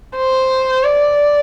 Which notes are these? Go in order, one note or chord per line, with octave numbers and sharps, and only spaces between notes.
C5
D5